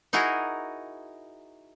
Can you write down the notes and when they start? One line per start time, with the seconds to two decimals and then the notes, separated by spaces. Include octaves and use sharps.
0.13 D#4 E4 F#4 G#4 A#4